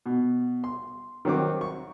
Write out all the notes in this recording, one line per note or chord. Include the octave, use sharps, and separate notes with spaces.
B2
C6
D#3 F#3 C4 D6
C#6